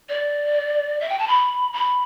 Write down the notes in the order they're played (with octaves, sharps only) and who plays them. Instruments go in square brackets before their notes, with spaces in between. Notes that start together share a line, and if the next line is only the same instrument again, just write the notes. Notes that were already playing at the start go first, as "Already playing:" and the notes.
[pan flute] D5
E5
G5
A5
B5
B5